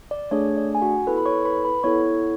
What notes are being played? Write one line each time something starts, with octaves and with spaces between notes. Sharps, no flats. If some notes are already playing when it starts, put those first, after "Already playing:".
D5
A3 D4 G#4 C#5
D5
G#5
F#4 F#5
B3 E4 A4 B4 B5
B5
C#5 C#6
B4 B5
B4 B5
B3 E4 A4 C#5 C#6